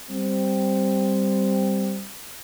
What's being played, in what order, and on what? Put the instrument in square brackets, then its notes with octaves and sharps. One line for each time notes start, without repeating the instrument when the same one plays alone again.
[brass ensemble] G3 C4